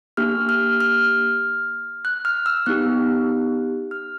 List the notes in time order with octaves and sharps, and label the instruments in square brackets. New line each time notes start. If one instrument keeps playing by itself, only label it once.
[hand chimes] A#3 D4 G4 F6
F6
F6
F#6
F6
E6
B3 D#4 G4 F#6
F6